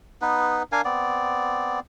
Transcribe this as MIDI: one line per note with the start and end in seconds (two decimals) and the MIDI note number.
0.22 0.63 59
0.22 0.63 63
0.22 0.63 71
0.72 0.81 62
0.72 0.81 70
0.72 0.81 77
0.72 0.81 80
0.85 1.80 59
0.85 1.80 60
0.85 1.80 74